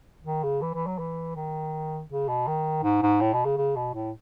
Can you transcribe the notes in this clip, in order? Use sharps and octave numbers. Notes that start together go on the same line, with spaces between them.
D#3
C#3
E3
E3
F#3
E3
D#3
C#3
B2
D#3
G#2
G#2
A2
B2
C#3
C#3
B2
A2